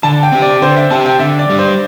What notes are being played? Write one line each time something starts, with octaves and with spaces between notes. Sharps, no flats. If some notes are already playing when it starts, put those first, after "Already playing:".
D3 A5
G5
C4 G4
D5
D3 C5
E5
C4 G4 A5
G5
D3 E5
D5
G3 D4
C5